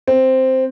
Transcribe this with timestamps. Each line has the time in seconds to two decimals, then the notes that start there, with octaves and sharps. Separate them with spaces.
0.07 C4